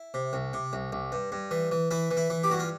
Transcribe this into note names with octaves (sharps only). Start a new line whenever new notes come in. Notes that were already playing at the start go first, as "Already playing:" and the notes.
Already playing: E4
C3
C2
C3
C2
C2
G2
G2
E3
E3
E3 E4
E3
E4
E3
G4
G2 F#4
F4